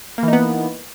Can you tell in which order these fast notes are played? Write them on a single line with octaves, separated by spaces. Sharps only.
A#3 E3 D#4 B3